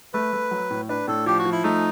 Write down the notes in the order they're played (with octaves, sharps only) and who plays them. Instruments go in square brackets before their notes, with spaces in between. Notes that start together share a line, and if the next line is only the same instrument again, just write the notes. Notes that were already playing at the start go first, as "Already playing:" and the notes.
[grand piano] A3 [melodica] B4
[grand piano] A3
F#3
A2
[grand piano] D4 [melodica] B4
[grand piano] A2 [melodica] A4
[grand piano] F3 [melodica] G4
[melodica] F#4
[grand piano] F3
[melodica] E4
[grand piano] A3 [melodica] D#4